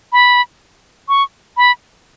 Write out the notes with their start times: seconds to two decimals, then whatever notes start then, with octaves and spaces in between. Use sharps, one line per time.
0.13 B5
1.09 C#6
1.57 B5